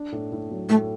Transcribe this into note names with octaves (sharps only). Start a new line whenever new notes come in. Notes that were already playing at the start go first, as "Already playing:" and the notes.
Already playing: D4
A2
A2
F#3
A2 A3